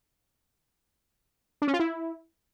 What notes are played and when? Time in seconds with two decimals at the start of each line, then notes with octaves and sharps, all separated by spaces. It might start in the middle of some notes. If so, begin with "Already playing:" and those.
1.62 D4
1.68 C#4
1.74 F4
1.79 E4